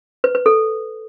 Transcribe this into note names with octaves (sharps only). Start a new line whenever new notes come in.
B4
B4
A4